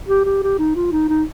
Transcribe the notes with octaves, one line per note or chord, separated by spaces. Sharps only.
G4
G4
G4
D#4
F4
D#4
D#4